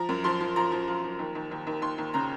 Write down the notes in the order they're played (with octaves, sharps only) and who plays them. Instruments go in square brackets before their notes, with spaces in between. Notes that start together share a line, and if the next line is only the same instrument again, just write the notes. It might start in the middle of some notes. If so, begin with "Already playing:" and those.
Already playing: [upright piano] F3 A#5
F#2
F3 C6
F3
F3 A#5
F3
F3
F3
D#2
D#2
D#2
D#2
D#2 C6
D#2
C#3 A#5